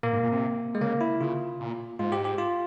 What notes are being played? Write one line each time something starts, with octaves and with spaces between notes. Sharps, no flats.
A#2 A#3
G#2
A#2
C3
G#3
C#3 A#3
E4
C#3 F4
A#2
G#2 F4
G4
G4
F4